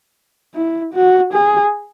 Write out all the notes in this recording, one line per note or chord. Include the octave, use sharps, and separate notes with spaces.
E4
F#4
G#4